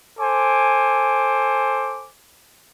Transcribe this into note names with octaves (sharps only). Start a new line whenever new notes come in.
A4 C5 G#5 D6